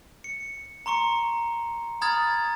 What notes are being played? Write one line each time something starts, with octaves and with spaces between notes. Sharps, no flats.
C#7
A#5 C6 C#6 C#7
A#5 B5 D#6 F6 G#6 A6